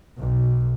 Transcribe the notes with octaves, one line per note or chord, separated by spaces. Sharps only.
B1